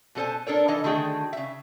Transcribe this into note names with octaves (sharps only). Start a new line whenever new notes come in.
B2 G3 A4 C5 G#5
D4 A4 A#4 C#5
E3 D#4 A4 D#5
D3 D#3 A3 F#4 G#4 G5
C#3 E5